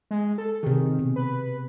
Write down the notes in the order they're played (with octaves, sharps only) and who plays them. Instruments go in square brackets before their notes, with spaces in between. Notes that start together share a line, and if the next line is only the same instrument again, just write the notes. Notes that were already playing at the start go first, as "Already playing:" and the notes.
[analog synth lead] G#3
A4
[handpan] C3 G#4 [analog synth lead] D#3
[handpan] B2
[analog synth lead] B4